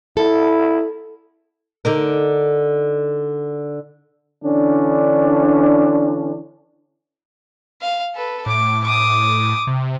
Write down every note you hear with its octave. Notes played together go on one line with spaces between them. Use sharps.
E4 A4
D3 D#4 A#4
D3 E3 C#4 D4
F5
A4 B4
A2 D6
D6 D#6
C3